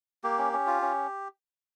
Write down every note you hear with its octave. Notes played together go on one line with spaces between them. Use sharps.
A#3 G4
C#4
C#4
F4
C#4